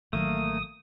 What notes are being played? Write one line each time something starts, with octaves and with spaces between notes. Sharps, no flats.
A1 D#3 F#3 A3 A#3 D#6